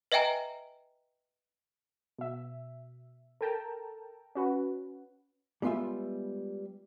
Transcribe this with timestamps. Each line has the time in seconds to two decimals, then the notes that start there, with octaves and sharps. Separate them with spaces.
0.12 B4 D#5 E5 G5 G#5 A#5
2.18 B2 E5
3.41 A4 A#4 G5 A5 A#5
4.35 C#4 F#4 B4
5.62 G3 G#3 B3 F4 B4 E5